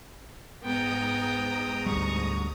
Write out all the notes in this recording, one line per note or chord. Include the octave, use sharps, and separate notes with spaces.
G#2 B3 G5 A#5 D#6
D2 G3 C#6